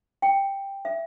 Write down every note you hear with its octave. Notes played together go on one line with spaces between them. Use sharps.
G5
E5